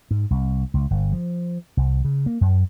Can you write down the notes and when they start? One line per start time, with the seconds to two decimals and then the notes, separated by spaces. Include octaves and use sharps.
0.11 G#2
0.31 C2
0.74 C#2
0.91 G1
1.13 F3
1.77 C2
2.05 C#3
2.26 A#3
2.41 F#2